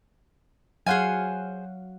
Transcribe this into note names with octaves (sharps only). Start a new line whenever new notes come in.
F#3 G#4 C5 F5 F#5 G#5